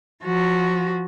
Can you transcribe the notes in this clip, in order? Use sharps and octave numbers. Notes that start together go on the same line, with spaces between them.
F3 F#4